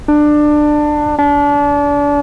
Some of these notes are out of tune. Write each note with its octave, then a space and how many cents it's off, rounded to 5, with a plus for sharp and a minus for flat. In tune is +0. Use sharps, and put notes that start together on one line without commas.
D4 +20
D4 -30